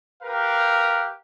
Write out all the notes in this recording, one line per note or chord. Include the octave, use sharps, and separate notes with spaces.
G4 A#4 B4 F5